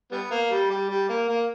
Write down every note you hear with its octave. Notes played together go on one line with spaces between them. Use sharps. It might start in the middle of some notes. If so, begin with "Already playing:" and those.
G3 B3
A#3
G3
G3
G3
A#3
A#3